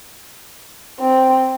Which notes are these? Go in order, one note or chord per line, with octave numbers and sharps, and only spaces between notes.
C4